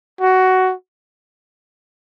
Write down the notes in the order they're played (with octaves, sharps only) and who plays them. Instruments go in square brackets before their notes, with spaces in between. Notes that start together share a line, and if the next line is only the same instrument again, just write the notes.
[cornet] F#4